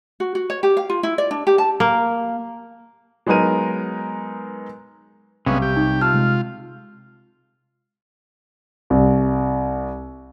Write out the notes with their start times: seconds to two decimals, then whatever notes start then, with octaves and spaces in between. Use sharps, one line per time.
0.20 F#4
0.35 F#4
0.50 C#5
0.63 G4
0.77 F5
0.90 F4
1.03 E4
1.18 D5
1.31 D4
1.47 G4
1.58 A5
1.80 A#3
3.27 F#3 G#3 B3 D#4 A#4 D#7
5.46 B1 C3 G3 G#3 B3 C#4 F5 C#6
5.62 G4
5.77 D#4
6.01 F4 A5 E6 F6
6.14 C3 G#3
8.90 C2